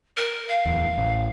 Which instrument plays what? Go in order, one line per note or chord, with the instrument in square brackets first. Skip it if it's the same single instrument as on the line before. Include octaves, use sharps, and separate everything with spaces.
[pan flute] A#4
F5
[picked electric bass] D1 E2
A1